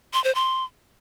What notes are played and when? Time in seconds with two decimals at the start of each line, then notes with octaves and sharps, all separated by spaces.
0.13 C6
0.24 C5
0.35 C6